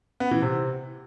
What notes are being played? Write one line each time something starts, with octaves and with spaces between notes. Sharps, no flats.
B3
E3
C3